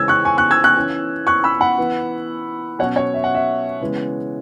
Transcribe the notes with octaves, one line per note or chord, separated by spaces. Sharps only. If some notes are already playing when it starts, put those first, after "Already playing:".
Already playing: C#3 E3 G#3 C#4 E6 G#6
C#6 F#6
G#5 C#6
C#6 F#6
E6 G#6
C#6 F#6
E3 C#4
C#6 F#6
B5 E6
F#5 B5
E3 B3
B2 F#3 C#4 C#5 F#5
C#5
E5
F#5
E5
C#3 E3 G#3 B3